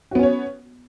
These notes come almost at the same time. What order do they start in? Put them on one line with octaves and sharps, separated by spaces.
F#4 B3 C#4 C#5